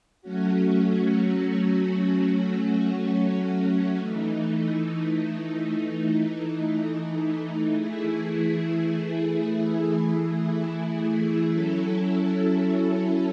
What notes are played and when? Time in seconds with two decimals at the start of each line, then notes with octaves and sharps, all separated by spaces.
0.22 F#3 A3 C#4 F#4
3.97 E3 A3 D#4
7.73 E3 A3 E4 G#4
11.48 F#3 C#4 E4 A4